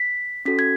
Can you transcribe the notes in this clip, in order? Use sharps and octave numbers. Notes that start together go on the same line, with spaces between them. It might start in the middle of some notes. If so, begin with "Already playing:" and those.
Already playing: B6
C#4 F#4 A4 B6
G#6